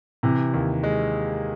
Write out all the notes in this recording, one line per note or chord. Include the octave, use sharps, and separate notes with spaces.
C3 E3
D#2
G#3